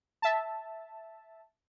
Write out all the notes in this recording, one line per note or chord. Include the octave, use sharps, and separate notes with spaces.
E5 A5